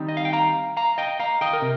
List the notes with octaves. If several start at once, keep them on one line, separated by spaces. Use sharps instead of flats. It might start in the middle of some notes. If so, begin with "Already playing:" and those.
Already playing: D#3 G3 C4 D#4
D#5
F5
G5
F5 A#5
F5 A#5
D#5 G5
F5 A#5
D#5 G5
A#4
C3